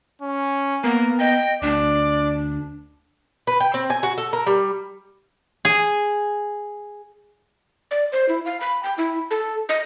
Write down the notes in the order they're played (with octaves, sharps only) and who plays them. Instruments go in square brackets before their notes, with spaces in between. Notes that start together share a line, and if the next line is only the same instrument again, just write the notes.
[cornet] C#4
[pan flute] A#3 [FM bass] B3 [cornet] A#4
[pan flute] D#5 [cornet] G5
[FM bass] D2 [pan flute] D4 [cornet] D5
[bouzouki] B4
G5
C4
G#5
F#4
A4
A#4
G3
[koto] G#4
[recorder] D5
C5
E4
F5
B5
G5
E4
A4
D#5